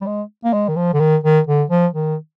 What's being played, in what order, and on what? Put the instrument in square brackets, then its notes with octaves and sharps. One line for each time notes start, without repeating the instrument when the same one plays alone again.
[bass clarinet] G3
G#3
A#3
G#3
D#3
F3
D3
D#3
D#3
D3
F3
D#3